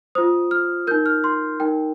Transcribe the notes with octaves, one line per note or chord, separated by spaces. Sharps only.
F4 C5 D#6
F6
D#4 A#4 G6
F6
C6
D#4 A#4 G5